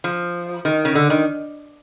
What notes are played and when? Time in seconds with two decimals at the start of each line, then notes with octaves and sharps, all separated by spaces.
0.04 F3
0.65 D#3
0.85 C#3
0.95 D3
1.10 D#3